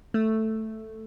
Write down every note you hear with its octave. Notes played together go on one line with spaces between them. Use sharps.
A3